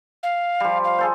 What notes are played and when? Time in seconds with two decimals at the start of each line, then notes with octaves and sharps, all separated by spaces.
0.23 F5
0.60 F3 G3
0.84 F5
0.98 G#4 A4 C5